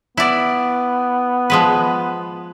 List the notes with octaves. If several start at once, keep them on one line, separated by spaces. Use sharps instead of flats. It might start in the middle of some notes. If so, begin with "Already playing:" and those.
B3 E4 D5
F3 G#3 B4